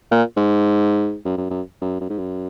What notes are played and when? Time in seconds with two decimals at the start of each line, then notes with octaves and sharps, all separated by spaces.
0.11 A#2
0.37 G#2
1.25 F#2
1.37 F#2
1.50 F#2
1.81 F#2
2.01 F#2
2.09 G#2
2.19 F#2